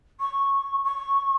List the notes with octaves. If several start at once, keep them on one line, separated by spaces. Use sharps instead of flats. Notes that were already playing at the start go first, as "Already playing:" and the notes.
C#6
C#6